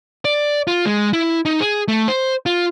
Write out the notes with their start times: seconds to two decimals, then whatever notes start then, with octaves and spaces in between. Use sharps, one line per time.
0.25 D5
0.67 F4
0.86 G#3
1.13 E4
1.45 D#4
1.60 G#4
1.88 A3
2.08 C5
2.46 F4